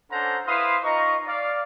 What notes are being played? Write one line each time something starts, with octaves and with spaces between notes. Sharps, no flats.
C#4 D4 A4 C5 F#5 A#5
E4 B4 C5 F5 C6 D#6
D#4 F4 D#5 A#5 C#6
D5 F5